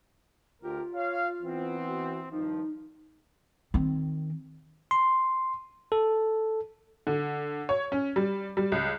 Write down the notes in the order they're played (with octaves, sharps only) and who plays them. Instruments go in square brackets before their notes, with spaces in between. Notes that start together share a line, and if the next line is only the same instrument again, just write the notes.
[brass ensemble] D2 G4 A#4 [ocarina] F4
[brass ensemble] C#5 F5
E3 B3 C4
[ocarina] F#4
[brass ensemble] G2 D#3 F3 [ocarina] D#4
[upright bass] D#3 C4
[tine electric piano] C6
A4
[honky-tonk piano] D3
C#5
C#4
G3
G3
C#2